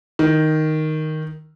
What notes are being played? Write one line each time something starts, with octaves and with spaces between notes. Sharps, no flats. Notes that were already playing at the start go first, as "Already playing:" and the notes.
D#3